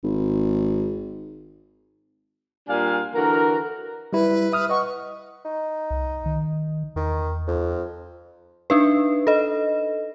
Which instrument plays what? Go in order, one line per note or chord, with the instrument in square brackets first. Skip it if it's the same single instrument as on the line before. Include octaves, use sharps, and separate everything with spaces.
[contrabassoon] G#1
[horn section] A#2 G3 D4 F5 G#5
D3 E3 F#4 A#4
[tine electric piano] G3 E4 [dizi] B4
[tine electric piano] E5 D#6 F6
[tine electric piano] D#5 F#5 [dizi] C#6
[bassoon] D#4
[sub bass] C2
D#3
[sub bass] E2 [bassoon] D#3
[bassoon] F2
[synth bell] D4 D#4 B4
A4 D#5